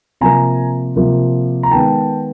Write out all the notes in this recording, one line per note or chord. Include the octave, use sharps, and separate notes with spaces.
C3 F3 A#3 G#5 A#5
C3 F3 A#3
A#5
D#3 G#3 B3 G5 A5